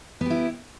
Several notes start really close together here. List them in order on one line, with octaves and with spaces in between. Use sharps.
B3 G4 E4